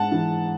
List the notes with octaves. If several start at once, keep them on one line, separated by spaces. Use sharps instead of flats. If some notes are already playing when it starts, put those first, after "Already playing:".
Already playing: G#2 G#3 F#5 A5
E3